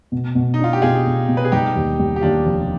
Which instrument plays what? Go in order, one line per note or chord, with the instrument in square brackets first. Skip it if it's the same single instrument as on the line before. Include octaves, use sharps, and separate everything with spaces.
[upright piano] B2
B2
[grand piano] D#4
[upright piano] D4 [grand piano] F4
[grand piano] G4
[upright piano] B2 [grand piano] F4 G#4
[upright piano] B2
B2
[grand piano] B4
G#4
[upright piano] G3 [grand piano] D#4 G4
[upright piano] D#2
G3
[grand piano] G4
[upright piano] D#2 [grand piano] D4 F4
[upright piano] F1